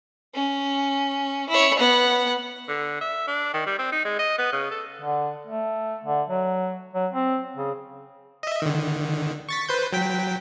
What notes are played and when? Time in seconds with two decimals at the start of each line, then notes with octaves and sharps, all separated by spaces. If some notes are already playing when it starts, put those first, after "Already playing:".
0.34 C#4
1.49 E4 C#5
1.78 B3 F#5
2.68 D3
3.01 E5
3.28 D4
3.54 D#3
3.67 G3
3.79 C4
3.92 D#4
4.05 G#3
4.19 D#5
4.38 B3
4.52 C#3
4.71 A4
5.02 D3
5.47 A3
6.04 D3
6.28 F#3
6.94 F#3
7.13 C4
7.56 C#3
8.43 D#5 E5
8.62 D3 D#3
9.49 C#6 A6 B6
9.69 B4 C5 G6
9.93 F#3 G5 B6